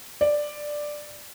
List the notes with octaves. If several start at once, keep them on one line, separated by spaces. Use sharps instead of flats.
D5